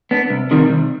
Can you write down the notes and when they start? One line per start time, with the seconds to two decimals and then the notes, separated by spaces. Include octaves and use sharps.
0.11 B3 D4
0.30 C2
0.51 C3 D#3 G3
0.70 C2